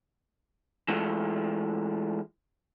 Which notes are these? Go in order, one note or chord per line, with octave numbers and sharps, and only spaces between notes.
E3 G#3 A3 F4